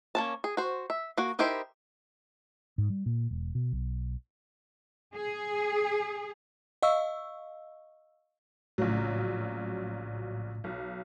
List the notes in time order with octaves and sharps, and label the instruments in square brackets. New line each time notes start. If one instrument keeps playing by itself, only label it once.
[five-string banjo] A#3 C#4 A5
G#4
F#4 C5
E5
A#3 F#4
D#4 E4 G4 A#4 C5
[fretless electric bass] G#2
G3
A#2
E1
B2
B1
[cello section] G#4
[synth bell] D#5 F5 C#6 E6
[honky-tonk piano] A#1 C#3 F#3 [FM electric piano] A2
[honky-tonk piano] B1